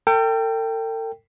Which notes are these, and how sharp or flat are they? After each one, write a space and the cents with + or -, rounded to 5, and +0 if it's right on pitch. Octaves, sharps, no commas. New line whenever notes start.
A4 +45 G5 +0